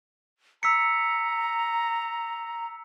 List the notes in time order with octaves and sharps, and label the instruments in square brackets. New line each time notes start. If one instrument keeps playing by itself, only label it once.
[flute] A#5 [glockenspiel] E6 B6 C#7